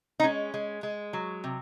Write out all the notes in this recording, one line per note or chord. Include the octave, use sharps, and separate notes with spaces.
D#4
G#3 C#4
G#3
G#3
F#3
C3